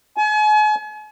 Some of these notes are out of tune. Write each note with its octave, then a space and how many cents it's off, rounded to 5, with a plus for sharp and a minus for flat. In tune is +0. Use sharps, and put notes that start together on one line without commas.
G#5 +40